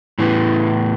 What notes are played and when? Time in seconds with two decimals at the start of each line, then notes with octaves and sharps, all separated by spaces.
0.19 A2 E3 B3